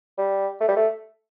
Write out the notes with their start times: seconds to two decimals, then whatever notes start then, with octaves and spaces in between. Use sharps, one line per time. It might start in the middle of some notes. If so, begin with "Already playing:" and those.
0.18 G3
0.61 A3
0.68 G3
0.76 A3